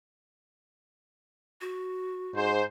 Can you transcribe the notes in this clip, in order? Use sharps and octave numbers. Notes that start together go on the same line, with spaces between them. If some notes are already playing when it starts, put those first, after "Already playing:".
F#4
G#2 C5